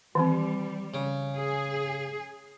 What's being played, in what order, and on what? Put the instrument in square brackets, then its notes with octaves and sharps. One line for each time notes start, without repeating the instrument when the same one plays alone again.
[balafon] D#3 E3 C4 [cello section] G3
[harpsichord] C#3
[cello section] G#4